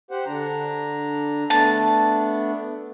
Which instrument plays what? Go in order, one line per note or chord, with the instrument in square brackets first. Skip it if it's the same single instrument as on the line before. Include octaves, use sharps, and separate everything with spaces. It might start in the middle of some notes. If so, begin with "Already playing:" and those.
[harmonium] G4 C5 F#5
D3 D4 A#5
[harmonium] A3 B3 D4 [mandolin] A5